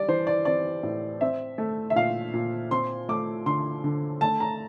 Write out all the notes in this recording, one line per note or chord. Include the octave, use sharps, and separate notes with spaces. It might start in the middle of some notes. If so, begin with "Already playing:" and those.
Already playing: G3 D5
E3 C5
D5
C4 D5
A2
C4 E5
A3
E5
A#2 F5
A#2
C4 C6
A3 D6
D3 C6
D3
A3 A5
A#5